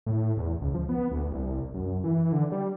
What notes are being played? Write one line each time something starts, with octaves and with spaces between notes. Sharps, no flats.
A2
E2
C#2
F3
B3
D2
C2
F#2
E3
D3
G3